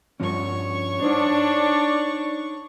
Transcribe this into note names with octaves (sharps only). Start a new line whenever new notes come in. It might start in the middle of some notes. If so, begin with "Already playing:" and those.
G2 F3 C#4 C#5 C#6
D4 D#4 C5